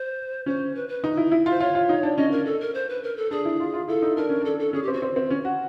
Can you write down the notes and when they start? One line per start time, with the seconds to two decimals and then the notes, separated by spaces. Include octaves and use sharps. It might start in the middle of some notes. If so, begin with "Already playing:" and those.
Already playing: C5
0.46 C#4 C5
0.75 B4
0.89 B4
1.04 D#4
1.17 E4
1.32 E4
1.46 F4
1.50 C5
1.60 F4 C#5
1.75 F4
1.89 D#4
2.03 D4
2.17 C#4 D#5
2.31 A#4
2.46 A4
2.60 A#4
2.74 C5
2.89 B4
3.03 A#4
3.17 A4
3.31 D4 G#4
3.45 E4
3.60 F4
3.74 F4
3.88 E4 A4
4.02 D#4
4.17 D4 A#4
4.29 C#4
4.41 D4 A4
4.59 A4
4.73 C#4 G#4
4.83 G4
4.88 C4
4.93 F#4
5.02 C4
5.16 C4
5.30 C#4
5.45 F#4